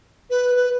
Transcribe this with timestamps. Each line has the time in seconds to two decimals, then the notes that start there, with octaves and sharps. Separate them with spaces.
0.30 B4
0.55 B4